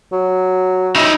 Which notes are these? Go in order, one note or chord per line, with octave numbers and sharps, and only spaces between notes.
F#3
D#4 E5